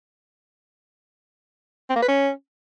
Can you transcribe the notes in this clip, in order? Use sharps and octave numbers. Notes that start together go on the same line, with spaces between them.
C4
A#3
B4
C#4